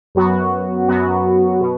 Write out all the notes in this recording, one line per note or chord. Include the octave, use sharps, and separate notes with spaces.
F#2 F#3 B3 F#4
F#2 F#3 B3 F#4
B2